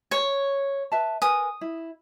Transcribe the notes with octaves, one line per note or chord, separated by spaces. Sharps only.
C#5
B4 E5 A5
A#4 B4 G#5 D#6
E4